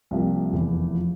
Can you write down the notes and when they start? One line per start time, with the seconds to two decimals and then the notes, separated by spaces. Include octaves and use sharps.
0.11 C2 C3 F3 A#3
0.53 F1 E2 E3
0.95 F3